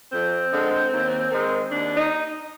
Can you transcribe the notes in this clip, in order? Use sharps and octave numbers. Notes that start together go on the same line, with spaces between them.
F2 C4
D3 G#3
D#2
D#3 G#3
D#2 D4
D#4